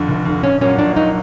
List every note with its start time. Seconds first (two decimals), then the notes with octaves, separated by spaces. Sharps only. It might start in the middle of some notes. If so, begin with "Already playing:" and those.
Already playing: F2 D3
0.08 F1
0.25 F2 D3
0.43 A#1 C#4
0.61 A#2 F#3 C#4
0.79 A#1 D4
0.96 A#2 F#3 D#4